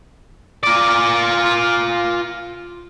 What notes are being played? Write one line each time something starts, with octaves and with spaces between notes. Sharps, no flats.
F4 D5